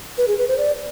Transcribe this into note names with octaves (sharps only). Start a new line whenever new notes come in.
B4
G#4
B4
C5
D5